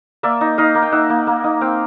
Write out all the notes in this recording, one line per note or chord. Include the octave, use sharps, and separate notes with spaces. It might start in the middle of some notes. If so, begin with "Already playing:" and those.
A#3 D5 E5
D#4
D#4 D#5 F5
A#3
G5
D#4 E5 F#5
A#3
A#3
D#4
C4 F5 G5